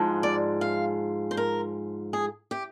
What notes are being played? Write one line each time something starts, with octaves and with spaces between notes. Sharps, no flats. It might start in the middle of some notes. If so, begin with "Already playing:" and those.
Already playing: G#2 F3 G#3
D5
F5
C5
A#4
G#4
G4